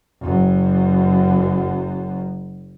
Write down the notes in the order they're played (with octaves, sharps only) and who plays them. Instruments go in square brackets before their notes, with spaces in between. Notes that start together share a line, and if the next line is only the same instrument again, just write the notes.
[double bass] F#1 F#2